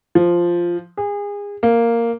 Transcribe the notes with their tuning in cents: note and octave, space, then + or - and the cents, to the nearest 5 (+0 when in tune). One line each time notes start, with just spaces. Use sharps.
F3 -5
G#4 -30
A#3 -5